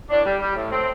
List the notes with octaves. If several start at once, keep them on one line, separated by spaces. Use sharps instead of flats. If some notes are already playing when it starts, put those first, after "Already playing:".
A2 D4
G3
G3
A2
A2 C4